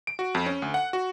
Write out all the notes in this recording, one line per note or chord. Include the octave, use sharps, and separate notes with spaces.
D7
F#4
F2
C#4
D2
F#5
F#4